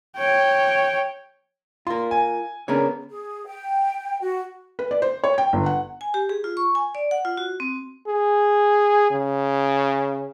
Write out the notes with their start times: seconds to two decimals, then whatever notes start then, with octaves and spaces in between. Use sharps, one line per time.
0.18 C#5 G5
1.87 F4 A#4 C6
2.11 G#5
2.68 C#3 B3 D4 A#4 C#5
3.10 G#4
3.46 G5
4.21 F#4
4.79 B4
4.91 D5
5.02 C5
5.24 C#5
5.38 G5
5.53 G1
5.66 F#5
6.01 G#5
6.14 G4
6.29 G#4
6.44 F4
6.57 C#6
6.75 G#5
6.95 D5
7.11 F#5
7.25 F4
7.37 F#4
7.60 C4
8.07 G#4
9.11 C#3